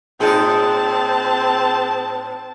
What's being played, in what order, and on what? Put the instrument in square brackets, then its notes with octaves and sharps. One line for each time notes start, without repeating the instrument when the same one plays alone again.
[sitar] A2 D#4 G#4 [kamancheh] C4 A5